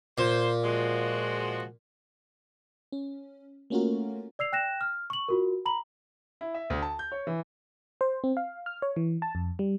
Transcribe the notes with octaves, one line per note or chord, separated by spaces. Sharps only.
A#2 C5
F3 G#3 F#4
C#4
A3 A#3 C#4 F4 F#4 A#4
D5 E6 C7 F7
G5 F#6 A#6 E7
F6
C#6 F#7
F4 F#4 A#4
A#5 B5 F#7
E4
E5
D2
A5
G6
C#5
E3
C5
C4
F5
F6
C#5
E3
A5
F2
G3